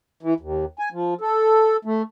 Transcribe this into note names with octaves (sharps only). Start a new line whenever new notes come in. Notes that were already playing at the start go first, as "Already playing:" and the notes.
E3
D#2
G#5
F3
A4
A3